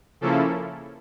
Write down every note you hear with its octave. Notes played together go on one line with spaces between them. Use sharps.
C#3 F3 A#3 C#4 E4 A4